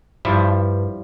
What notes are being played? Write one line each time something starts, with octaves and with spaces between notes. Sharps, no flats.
G2 F3 G3 E4